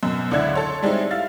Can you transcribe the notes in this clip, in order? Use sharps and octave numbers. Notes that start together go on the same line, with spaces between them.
F#2 B2
C#2 D3 D4 E4 F#5 G#6
A4 C#5 C6
G3 G#3 C4 D#4 E4
E4 F5 A6